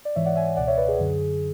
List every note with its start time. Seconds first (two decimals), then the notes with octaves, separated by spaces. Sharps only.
0.05 D5
0.16 G#2 E3 C#5 E5
0.25 D5 F#5
0.36 E5 G#5
0.56 C#2 B2 D5 F#5
0.67 C#5 E5
0.77 B4 D5
0.88 G#4
0.99 F#2 D3